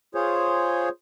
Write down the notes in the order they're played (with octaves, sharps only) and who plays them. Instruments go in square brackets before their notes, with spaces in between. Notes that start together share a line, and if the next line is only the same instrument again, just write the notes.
[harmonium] F4 G#4 C5 C#5